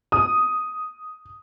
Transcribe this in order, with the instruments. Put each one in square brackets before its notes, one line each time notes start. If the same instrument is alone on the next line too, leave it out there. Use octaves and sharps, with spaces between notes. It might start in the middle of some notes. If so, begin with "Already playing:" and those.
[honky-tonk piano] D#6